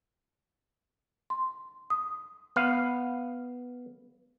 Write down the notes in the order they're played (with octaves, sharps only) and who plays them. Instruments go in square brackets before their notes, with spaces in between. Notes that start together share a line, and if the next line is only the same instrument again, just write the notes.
[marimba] C6
D#6
[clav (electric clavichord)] B3 F5